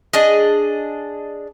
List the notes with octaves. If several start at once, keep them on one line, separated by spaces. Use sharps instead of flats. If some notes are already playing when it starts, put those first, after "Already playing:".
D4 G#4 D#5